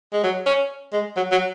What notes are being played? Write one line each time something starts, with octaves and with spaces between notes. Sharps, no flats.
G#3
F#3
C#4
G#3
F#3
F#3